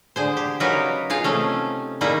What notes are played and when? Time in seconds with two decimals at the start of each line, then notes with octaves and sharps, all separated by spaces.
0.16 D3 G#4 C5
0.37 G4
0.60 C#3 F#3 D#4 A#4 B4 C#5
1.10 D#4 F4 G#4 F5
1.24 C3 A3 C#4
2.01 D#3 G3 A#3 D#4 E4 G#4